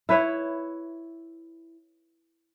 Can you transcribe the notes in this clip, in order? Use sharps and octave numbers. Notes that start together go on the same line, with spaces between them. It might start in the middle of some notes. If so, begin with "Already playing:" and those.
E4 B4 C#5 E5